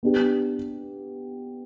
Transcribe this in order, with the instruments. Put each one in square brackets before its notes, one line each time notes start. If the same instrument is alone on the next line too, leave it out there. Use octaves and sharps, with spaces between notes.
[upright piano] B3 D4 G4